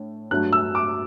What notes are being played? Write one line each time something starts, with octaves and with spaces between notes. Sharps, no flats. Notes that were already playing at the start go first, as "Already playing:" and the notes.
Already playing: A2 D4
G2 F#3 A3 F#6
E6
D6